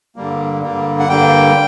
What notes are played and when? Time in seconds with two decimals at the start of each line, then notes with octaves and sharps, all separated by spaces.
0.16 G2 D3 G3 A#3
0.63 G2 D3 G3 A#3
0.99 F#5
1.08 G2 D3 G3 A#3 G5